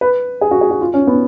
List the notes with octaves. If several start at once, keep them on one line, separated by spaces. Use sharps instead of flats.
B4
G#4
F#4
G#4
F#4
F4
C#4
B3